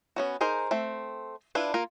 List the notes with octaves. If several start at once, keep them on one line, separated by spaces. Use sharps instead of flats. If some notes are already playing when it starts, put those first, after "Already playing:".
B3 C#4 F#4
D#4 G#4 A#4 C5
A3 C4
D4 E4 F4 B4
A#3 F4 A#4